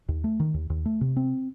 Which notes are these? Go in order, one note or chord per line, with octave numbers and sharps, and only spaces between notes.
D#2
A3
D#3
D#2
D#2
A3
C3
C4